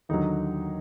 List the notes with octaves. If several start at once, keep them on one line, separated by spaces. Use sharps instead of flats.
D#2 D3 F#3 D#4